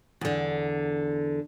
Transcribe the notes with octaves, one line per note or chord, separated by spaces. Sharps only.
E2 D3